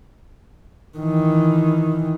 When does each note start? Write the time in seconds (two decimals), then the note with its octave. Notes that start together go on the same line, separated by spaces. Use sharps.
0.98 D#3 E3